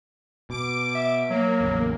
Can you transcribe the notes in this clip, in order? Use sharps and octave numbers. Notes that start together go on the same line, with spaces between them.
B2 D6 D7
E5
F#3 A#3
A1 E2 C#3